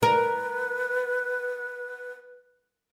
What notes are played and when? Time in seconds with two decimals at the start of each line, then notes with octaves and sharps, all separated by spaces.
0.03 A#4 B4